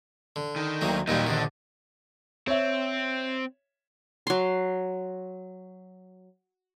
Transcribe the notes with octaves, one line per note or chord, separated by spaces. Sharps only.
D3
D#3
D2 F#3 A#3
D#2 A#2 F#3 G3 D#4
A#1 D3 D#3
C4 C#5 E5
F#3 C6